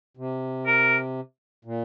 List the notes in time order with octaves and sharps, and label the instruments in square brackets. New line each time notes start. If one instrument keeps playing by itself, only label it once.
[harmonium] C3
[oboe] A#4
[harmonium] A#2